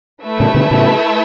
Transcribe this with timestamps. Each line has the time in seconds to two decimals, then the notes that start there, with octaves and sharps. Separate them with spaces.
0.24 A3 E4 B4 E5 A5
0.40 A2 C#3
0.54 B2 D3
0.71 A2 C#3